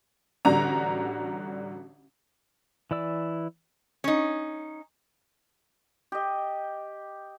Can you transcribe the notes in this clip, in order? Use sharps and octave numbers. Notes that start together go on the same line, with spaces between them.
A1 D3 G3 F#4 A#5
E3 E4 D5 E6
C#4 D#4
G4 D#5